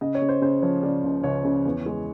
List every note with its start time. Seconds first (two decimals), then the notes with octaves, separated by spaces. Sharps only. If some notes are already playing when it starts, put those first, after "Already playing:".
0.01 C#3 D#5
0.15 C#5
0.21 C#3
0.29 C5
0.42 C#3 C5
0.62 F3 C#5
0.83 C#3 D5
1.04 C#2
1.24 C#2 C#5
1.45 C#3
1.65 E2
1.86 G#3